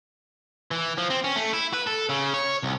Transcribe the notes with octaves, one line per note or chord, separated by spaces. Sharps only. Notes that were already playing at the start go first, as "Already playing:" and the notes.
E3
F3
C4
C#4
A3
E4
B4
A4
C#3
C#5
C2